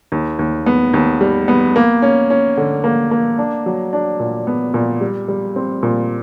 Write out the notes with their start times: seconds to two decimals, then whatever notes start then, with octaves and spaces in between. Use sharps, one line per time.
0.12 D#2
0.39 D#2
0.66 B3
0.94 D#2
1.21 G3
1.48 B3
1.76 A#3
2.02 C#4
2.30 C#4
2.57 D3
2.84 A#3
3.11 A#3
3.38 D4
3.66 F#3
3.93 D4
4.20 A#2
4.47 B3
4.74 A#2
5.01 G3
5.28 G3
5.56 C4
5.83 A#2